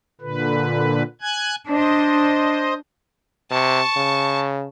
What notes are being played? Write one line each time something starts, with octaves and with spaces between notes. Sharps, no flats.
A#2 D3 B4
G#5 F#6 G#6
D4 C5 D#5
C3 A5 C#6
C#3